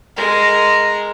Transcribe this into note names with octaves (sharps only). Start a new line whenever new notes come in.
G#3 A#4